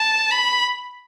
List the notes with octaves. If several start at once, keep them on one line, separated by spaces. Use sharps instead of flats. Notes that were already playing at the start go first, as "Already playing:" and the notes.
Already playing: A5
B5